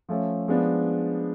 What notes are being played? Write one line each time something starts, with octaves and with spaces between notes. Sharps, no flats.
F3 A3 C#4
F3 G#3 B3 D4